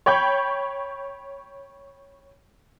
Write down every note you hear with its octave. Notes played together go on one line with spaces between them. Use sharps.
C#5 G5 B5 C#6 G6